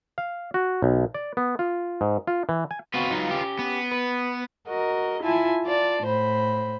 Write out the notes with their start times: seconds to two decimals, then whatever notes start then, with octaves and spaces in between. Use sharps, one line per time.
0.18 F5
0.54 F#4
0.82 B1
1.14 D5
1.37 B3
1.59 F4
2.01 G#2
2.27 F4
2.49 E3
2.71 G#5
2.94 B3 C4 F4 F#4 B4
3.10 F#3 D#4
3.31 C#4 G4
3.59 B3
3.92 B4
4.68 F#4 A#4 D#5
5.23 E4 F4 G#5 A5
5.65 F4 D5 A5
6.02 A2 C5 B5